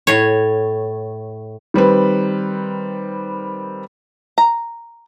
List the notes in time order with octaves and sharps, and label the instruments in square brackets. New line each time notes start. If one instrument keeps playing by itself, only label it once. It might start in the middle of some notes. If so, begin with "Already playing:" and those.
[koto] A2 C#5
[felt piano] D#3 G3 C4 B4
[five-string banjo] A#5